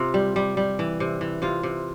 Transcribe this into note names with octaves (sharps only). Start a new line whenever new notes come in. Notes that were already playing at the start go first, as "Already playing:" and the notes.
Already playing: C3 F4
G3
G3
G3
E3
C3
E3
C3 F4
C3